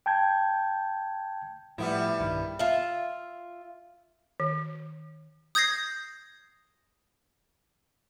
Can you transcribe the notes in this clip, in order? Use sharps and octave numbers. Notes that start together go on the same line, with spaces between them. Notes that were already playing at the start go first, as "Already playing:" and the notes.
G5 A5 G6 G#6
A2 F3 G3 B3 E4
B1 G2 D#3
F4 E5
D#3
D#6 G6 G#6 A#6 C7